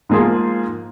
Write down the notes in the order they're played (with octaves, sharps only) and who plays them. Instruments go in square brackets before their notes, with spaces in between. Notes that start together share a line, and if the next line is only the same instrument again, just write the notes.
[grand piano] G#2 F3 A#3 F4 G#4